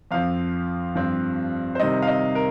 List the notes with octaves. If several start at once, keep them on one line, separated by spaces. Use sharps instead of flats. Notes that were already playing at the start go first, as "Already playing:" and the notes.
F2 F3 C4 F5
G2 F3 C4
C5
C3 D#3 G3 C4 D#5
F5
D#5
A#4